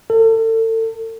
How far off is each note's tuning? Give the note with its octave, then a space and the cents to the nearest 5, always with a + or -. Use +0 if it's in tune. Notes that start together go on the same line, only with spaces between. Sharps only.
A4 +35